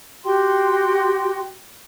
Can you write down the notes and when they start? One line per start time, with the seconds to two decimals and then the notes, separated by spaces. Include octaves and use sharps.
0.24 F#4 G4 G5 C6